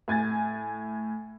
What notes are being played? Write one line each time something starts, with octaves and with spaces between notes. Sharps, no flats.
A2 G#5 G#6 A6